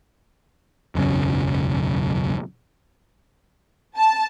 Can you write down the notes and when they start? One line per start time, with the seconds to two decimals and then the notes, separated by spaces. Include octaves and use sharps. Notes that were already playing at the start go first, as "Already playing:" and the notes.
0.95 E1 B1 F#2 C#3
3.98 A5